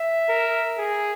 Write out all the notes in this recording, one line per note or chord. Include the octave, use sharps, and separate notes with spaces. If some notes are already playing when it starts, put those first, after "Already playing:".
Already playing: E5
A#4
G#4